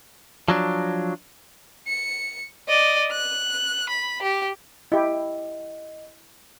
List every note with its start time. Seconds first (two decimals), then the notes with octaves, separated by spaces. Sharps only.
0.48 F3 F#3 D4
1.87 C#7
2.68 D5 D#5
3.12 F#6
3.89 B5
4.22 G4
4.92 E4 G4 D#5